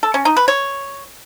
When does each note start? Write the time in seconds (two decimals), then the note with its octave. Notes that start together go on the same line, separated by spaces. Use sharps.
0.03 A4
0.14 C#4
0.25 D#4
0.37 B4
0.48 C#5